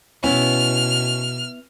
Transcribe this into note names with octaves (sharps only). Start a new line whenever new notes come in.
B2 B3 C#4 E4 F6